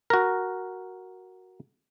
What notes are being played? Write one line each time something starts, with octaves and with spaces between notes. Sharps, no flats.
F#4 A#4